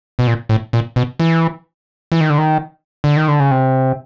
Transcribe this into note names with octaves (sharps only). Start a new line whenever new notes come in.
B2
A#2
A2
A#2
B2
E3
E3
D#3
D3
D#3
D3
D#3
D3
C#3
C3